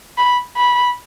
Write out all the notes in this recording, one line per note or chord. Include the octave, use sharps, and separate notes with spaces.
B5
B5